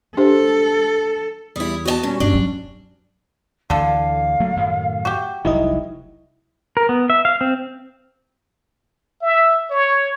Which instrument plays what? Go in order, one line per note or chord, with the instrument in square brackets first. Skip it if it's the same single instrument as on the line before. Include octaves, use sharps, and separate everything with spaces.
[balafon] D4 G4 C5 [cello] A4
[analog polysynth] E2 [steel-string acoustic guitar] G3 E4 [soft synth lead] D#6
[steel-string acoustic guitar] B3 D#5 A5 [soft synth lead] F#4
[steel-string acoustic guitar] A#2 [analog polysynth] G3 C#4
[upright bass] G2 [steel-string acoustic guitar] D4
[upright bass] F#3 C4
[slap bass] D2 E3 [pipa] D3 A4 [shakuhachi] F5
[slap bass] F#3 A3 A#3
F#2 A2 D#3
[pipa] F#4 G4
[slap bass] F1 C2 F#3 [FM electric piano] D#4 E4 D#5
[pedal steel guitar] A#4
B3
E5
F5
C4
[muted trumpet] E5
C#5